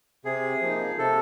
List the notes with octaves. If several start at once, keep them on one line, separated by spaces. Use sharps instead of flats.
C3 G#4
F3 A#3 D#4
C3 A4